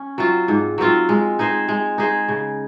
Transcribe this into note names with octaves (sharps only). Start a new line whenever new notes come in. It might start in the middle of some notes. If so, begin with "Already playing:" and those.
Already playing: C#4
F#3 C4 F4
G#2
F#3 C4 F4
G#3
D#4 G#4 C5
G#3
D#4 G#4 C5
C#3